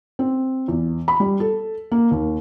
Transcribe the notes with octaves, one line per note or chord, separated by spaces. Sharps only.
C4
E2
B5
G3
A4
A#3
D#2